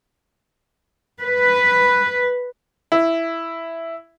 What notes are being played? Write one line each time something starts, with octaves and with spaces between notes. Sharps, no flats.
B4
E4